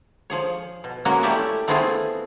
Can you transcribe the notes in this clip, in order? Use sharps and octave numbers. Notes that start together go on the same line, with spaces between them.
F3 G#4 C#5
B2
G#3 A#3 C#4 F#4
A3 C#4 E4 G4 D5 E5
A3 B3 C4 E4 F4 G#4